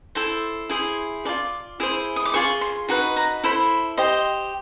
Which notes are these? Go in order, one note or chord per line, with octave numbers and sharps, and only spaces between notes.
E4 A4 C5
E4 G#4 C5
F4 A4 D5 D6
E4 G#4 C5
D#6
D6
F4 G#4 C#6
C6
D#4 F#4 B4
A#5
E4 A4 C5 B5
G4 C5 D#5